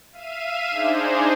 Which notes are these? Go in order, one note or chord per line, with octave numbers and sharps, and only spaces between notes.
E5 F5 D#7
D4 D#4 G#4 C5